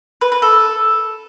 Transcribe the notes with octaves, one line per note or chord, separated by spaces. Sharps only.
B4
B4
A4